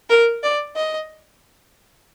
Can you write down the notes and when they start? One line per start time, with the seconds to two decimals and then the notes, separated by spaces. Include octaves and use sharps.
0.10 A#4
0.43 D5
0.76 D#5